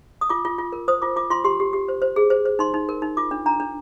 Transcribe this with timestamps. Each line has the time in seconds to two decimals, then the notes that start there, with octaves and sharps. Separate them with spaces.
0.21 D#6
0.29 F4 D6
0.45 F4
0.58 F4
0.72 A#4
0.88 C5 D#6
1.02 F4 D6
1.16 F4 D6
1.30 F4 C6
1.44 G4 C6
1.60 G4
1.73 G4
1.88 C5
2.02 C5
2.16 G#4
2.30 C5
2.46 C5
2.59 D#4 C6
2.74 D#4
2.89 A#4
3.02 D#4
3.17 F4 D6
3.31 D4
3.46 D4 A#5
3.60 D4